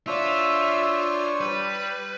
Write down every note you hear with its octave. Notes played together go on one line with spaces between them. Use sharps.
D4 F4 C5 C#5 E5
G3 B4